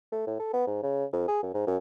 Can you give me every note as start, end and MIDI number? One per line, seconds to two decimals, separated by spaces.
0.12 0.22 57
0.27 0.37 45
0.40 0.49 69
0.53 0.66 59
0.67 0.79 44
0.83 1.05 49
1.13 1.24 41
1.28 1.42 68
1.43 1.51 42
1.54 1.66 44
1.67 1.77 42